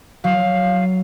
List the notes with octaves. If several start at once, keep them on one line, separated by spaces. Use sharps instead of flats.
F#3 F5